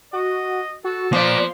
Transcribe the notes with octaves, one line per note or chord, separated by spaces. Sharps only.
F#4 D#5
F#4 A4
F3 A#3 B4 D5 C6